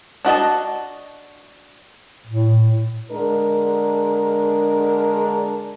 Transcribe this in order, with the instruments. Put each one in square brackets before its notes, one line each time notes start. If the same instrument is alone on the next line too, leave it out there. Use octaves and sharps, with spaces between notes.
[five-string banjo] D4 F#4 D#5 A5
[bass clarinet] A2
[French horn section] D3 G#3 D4 A#4